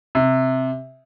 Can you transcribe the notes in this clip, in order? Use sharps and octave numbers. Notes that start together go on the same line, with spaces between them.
C3